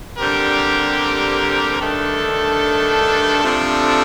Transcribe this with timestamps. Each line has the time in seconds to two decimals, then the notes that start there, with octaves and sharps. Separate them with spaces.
0.18 D3 G3 C4 G4 A#4
1.80 G2 D#3 A3 D4 A4
3.42 C3 F3 A3 D4 A4